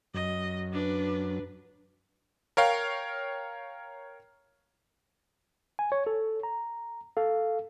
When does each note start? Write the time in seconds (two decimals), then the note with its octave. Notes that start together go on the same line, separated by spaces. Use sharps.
0.14 F#2 D#5
0.73 D4 B4
2.57 A#4 C#5 F5 G5
5.79 G#5
5.92 C#5
6.07 A4
6.43 A#5
7.17 A4 F5